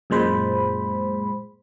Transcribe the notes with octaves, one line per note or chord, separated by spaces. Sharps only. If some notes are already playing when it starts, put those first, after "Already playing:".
F#2 A#2 G#3 C5 B5